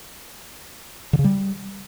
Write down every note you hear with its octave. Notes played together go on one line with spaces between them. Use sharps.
D3
C#3
G3